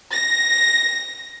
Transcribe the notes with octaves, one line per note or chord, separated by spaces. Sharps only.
A#6